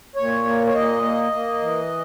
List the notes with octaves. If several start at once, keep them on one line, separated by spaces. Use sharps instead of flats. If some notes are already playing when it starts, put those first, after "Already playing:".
A#2 C#5
A#3
C#5
A#2 D#5
A#3
A#3
E3